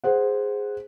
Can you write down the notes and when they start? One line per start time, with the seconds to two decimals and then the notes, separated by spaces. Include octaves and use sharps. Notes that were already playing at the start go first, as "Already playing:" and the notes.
0.04 G#4 C5 F#5